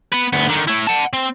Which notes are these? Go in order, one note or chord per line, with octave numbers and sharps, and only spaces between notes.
B3 B4
D2 B3
D3 D#3
A3 E4
F#5 A5
C4